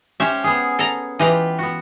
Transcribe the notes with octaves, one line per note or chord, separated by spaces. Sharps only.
C#4 G4 C5 E5
B3 G#4
A4 A#5
E3 F4 G4 B4 D#5 F5
B3 F#4